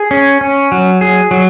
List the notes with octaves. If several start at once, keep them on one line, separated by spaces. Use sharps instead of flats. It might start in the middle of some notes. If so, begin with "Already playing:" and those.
Already playing: G#4
C#4
C#4
F#3
G#4
F#3